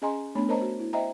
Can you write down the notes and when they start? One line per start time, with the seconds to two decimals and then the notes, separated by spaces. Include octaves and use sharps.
0.02 C#4 G#4 D#5 G#5 A#5 C6
0.35 A3 B3 D4 C#5 B5
0.48 A#4 C5 C#5 D#5 A5 A#5
0.61 F#4
0.79 E4
0.93 C5 D#5 E5 G5 A#5